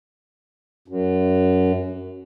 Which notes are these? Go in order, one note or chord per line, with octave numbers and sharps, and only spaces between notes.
F#2